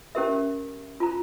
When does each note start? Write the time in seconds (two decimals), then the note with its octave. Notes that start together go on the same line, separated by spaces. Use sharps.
0.15 C#4 G4 A#4 E5
1.00 F4 A#5